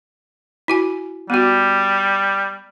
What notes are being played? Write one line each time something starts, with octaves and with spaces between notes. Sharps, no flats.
E4 F#4 G#5
G3 B3 F#4